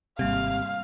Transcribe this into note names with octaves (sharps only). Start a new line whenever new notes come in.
G#1 C3 G3 A#3 F5